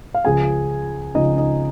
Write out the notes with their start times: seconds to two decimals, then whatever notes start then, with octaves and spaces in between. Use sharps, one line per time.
0.14 F5
0.25 C#2 C#3 F3 G#4 G#5
1.15 C#2 C#3 F3 D#4 D#5
1.37 D#4 D#5